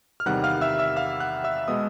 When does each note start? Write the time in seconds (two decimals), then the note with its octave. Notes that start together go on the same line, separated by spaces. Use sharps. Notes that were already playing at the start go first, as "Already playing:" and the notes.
0.20 F6
0.26 E2 C3 D#3 G3 F#5 F#6
0.44 F5 F6
0.61 E5 E6
0.79 E5 E6
0.97 F5 F6
1.20 F#5 F#6
1.44 E5 E6
1.68 B2 G#3 B3 D#5 D#6